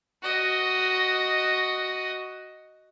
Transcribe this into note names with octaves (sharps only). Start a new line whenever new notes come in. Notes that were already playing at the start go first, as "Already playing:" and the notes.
F#4 D#5